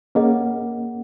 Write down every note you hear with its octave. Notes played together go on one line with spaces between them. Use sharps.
A#3 C#4 G#4 D#5 F#5